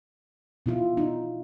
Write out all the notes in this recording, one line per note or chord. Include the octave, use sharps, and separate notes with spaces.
B2 E4 F4
D#4